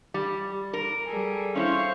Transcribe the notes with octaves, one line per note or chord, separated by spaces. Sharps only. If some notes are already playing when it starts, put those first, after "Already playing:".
G3
A#4
G3 G#4 A4
C#4 D#4 E4 C5 F5 C#6